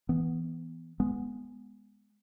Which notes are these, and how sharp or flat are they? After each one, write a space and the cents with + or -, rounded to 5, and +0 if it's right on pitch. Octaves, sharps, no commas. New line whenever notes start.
E3 +0 B3 +0
G#3 +0 B3 +0